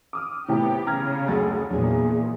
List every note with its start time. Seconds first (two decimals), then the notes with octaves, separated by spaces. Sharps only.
0.13 D6 D#6 F6
0.48 A2 C3 E3 B3 G4
0.87 C#3 A#5 F6 G#6
1.28 F#1 D2 G#4 A6
1.71 E2 A#2 F#3 D4 G#4